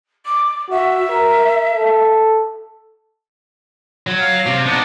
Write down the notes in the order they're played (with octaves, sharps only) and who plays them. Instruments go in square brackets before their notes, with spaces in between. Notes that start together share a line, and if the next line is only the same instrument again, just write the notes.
[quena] D6
[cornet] F#4 [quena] E5
[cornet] A#4
A4
[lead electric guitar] F#3
[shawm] F5
[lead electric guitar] C3
[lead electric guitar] B3 D#4 [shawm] D4